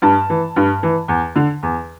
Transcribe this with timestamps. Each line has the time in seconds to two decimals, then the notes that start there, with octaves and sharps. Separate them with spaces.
0.02 G2 A5
0.30 E3
0.56 G2
0.83 E3
1.08 E2
1.36 D3
1.63 E2